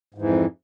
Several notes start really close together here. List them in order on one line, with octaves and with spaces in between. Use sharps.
G#2 E3 F2